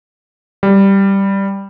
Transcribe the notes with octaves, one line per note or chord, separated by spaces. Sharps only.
G3